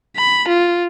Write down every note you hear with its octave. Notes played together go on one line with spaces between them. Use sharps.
B5
F4